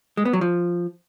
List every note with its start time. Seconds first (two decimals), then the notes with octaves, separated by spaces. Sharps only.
0.17 G#3
0.25 B3
0.33 F#3
0.41 F3